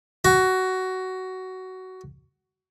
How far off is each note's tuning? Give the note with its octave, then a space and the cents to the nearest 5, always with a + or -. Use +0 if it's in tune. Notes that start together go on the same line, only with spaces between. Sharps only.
F#4 +15